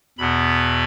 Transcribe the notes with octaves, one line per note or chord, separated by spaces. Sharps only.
E2 B2 B3 B5